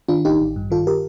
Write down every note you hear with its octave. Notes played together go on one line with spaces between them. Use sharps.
D#3 D4 F4
A1 D#4 G4
A1
G2
D#3 F4 A4
G4 A#4